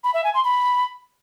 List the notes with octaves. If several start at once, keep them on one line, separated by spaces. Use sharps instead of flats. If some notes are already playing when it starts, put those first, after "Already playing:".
B5
E5
G#5
C6
B5